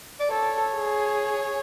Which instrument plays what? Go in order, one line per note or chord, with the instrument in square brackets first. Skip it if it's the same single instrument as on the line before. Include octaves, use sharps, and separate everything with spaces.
[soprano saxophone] D5
[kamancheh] A4 [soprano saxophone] C#5
[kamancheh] G#4